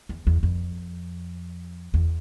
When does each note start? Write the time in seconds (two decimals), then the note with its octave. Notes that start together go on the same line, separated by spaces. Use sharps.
0.09 E2
0.27 E2
0.43 F2
1.94 E2